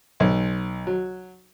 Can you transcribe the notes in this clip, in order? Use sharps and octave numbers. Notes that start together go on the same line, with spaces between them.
B1
F#3